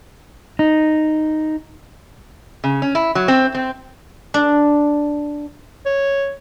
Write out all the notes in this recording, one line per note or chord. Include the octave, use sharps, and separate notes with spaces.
D#4
C#3
C#4
E4
F#3
C4
C4
D4
C#5